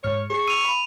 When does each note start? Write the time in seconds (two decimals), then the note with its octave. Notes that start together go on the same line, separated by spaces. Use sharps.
0.04 G#2 C#5 F6 C#7
0.30 G#4 C#6 C7
0.48 E6 D#7 F7
0.64 B5